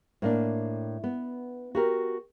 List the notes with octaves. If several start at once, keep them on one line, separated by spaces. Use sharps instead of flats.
A2 A#3 D4
B3
F#4 G4 A#4